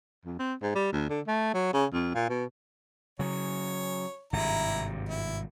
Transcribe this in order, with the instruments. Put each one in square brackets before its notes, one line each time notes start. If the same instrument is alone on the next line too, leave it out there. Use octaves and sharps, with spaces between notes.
[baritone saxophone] F2
C4
G#2
G3
D2
D3
A3
F#3
C#3
F2
A#2
B2
[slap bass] C#3 F#3 [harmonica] C#5
[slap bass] G#1 G2 C3 [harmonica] E4 A#5
[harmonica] E4